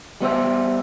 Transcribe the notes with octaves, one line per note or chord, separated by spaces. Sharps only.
G3 B3 C5 E5